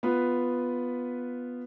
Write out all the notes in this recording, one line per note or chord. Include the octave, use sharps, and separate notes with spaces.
B3 F4 B4